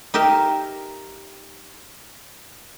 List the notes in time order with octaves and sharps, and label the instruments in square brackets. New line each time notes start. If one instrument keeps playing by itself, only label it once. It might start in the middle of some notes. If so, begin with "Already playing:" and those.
[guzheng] D#4 G4 A#4 E5